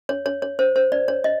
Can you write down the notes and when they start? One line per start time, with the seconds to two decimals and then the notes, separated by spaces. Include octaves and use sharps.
0.09 C#5
0.26 C#5
0.42 C#5
0.59 C5
0.76 C5
0.92 D5
1.08 C#5
1.24 D#5